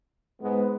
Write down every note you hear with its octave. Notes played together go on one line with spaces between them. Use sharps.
G#2 G#3 B3